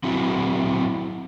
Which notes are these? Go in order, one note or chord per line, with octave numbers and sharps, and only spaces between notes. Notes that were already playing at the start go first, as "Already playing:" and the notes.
F#3 C4 E4 F#4